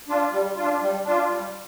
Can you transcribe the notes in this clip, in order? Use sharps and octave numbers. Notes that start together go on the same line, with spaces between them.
D4 F4
G3
D4 F4
G3
D4 F4
G3